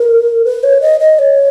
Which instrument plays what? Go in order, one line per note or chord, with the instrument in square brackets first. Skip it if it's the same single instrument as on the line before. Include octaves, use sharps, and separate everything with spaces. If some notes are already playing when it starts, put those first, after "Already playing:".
Already playing: [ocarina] A#4
B4
C#5
D#5
D#5
C#5